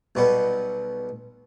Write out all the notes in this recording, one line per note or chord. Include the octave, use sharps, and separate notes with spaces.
B1 B2 G3 B3